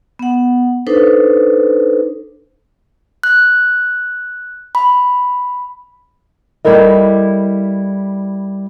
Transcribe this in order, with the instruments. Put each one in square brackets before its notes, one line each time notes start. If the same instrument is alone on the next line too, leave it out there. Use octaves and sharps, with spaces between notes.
[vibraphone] B3 F#5
D4 D#4 A4 B4 C5
[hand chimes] F#6
B5
[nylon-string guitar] G3 E4 A4 A#4 D#5